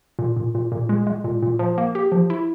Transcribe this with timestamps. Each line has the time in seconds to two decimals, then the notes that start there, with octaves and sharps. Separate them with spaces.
0.19 A#2
0.37 A#2
0.55 A#2
0.72 A#2
0.89 G#3
1.07 G#3
1.24 A#2
1.42 A#2
1.59 F3
1.78 A#3
1.95 G4
2.12 F3
2.30 E4